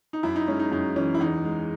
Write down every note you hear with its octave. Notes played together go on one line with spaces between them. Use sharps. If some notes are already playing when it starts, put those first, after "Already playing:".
D#4
F#2 E4
D#4
G#3 C#4
D#4
F#2 D#4
E3 C#4
E4
E2 D#4
G#3